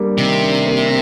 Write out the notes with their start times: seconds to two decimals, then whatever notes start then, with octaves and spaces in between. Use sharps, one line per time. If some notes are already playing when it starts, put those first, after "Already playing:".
Already playing: G3 A#3 D4
0.18 C3 D#3
0.43 D4
0.67 A#3